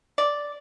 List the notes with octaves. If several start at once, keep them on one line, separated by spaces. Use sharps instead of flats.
D5